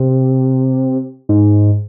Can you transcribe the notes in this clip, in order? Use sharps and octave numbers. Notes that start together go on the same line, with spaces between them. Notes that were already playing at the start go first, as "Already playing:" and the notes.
Already playing: C3
G#2